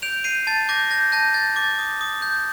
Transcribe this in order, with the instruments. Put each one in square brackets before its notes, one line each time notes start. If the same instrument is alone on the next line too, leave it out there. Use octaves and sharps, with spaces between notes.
[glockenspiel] G6 D7 F7
G6 C7 D#7
A5 A6
D6 G6 A#6
G6 A#6
A5 G6 A#6
G6 A6
D6 A6
D#6
D#6
G6